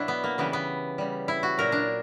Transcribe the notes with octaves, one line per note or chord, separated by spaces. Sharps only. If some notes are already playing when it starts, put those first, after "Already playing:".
Already playing: B2 F#3 D4 E4
B3
A#3
C#3 E3 G3 B3
B3
C#3 G3
E4
F#4
A#2 F#3 A#4
D4